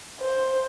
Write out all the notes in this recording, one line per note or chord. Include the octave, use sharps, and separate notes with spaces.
C5